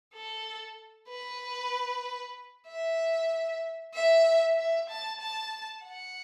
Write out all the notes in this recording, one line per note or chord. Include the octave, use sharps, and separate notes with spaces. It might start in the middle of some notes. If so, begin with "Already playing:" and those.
A4
B4
E5
E5
E5
A5
A5
F#5